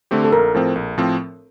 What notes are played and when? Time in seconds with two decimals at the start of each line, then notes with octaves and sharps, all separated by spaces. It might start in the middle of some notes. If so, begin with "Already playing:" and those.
0.11 D3 A3 C4 G4
0.25 A4
0.32 A#1 A#4
0.54 A2 F3 C4
0.75 A#1
0.98 A2 F3 C4